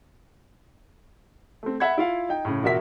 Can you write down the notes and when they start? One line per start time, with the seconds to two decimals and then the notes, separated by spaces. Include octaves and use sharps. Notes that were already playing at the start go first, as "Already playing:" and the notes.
1.63 A3 C4
1.80 E5 F#5 B5 G#6
1.98 E4 F4 F5
2.29 D#4 G5
2.45 A2 C#3
2.63 E1 A#2 F#4 A#4 E5 B6